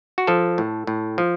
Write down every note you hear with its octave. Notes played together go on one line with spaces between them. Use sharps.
F#4
F3 A4
A2
A2
F3